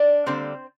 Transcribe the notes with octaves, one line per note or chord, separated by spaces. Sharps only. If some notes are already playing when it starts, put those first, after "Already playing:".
Already playing: D4 D5
D3 G3 A#3 C4 C5